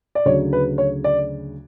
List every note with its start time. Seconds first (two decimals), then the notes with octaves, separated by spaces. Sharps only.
0.15 D5
0.25 D2 C#3 F#3 C#5
0.53 B4
0.78 C#5
1.04 D5